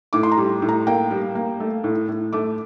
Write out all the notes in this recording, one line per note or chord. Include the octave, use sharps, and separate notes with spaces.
A2 D6
C6
A#5
G3
A2
A#5
A#3 G5
G3
A#3
A3
A2
A2
A3 D6